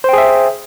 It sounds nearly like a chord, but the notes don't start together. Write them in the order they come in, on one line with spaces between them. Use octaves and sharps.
C5 G5 G#4 E5